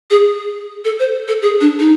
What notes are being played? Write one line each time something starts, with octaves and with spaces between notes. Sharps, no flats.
G#4
A4
C5
A4
G#4
D4
D#4